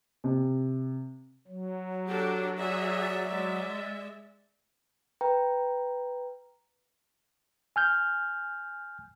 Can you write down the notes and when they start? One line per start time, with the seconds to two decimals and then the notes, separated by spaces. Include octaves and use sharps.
0.24 C3
1.47 F#3
2.07 D4 F#4 G4 A4
2.58 F#4 G#4 D5 E5
3.27 G#3 E5
5.21 B4 G5 A#5
7.76 G#5 F6 G6